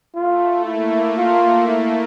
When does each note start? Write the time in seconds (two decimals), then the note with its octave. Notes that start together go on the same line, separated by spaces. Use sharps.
0.15 A3 F4
0.65 A#3 E4
1.17 F4
1.67 E4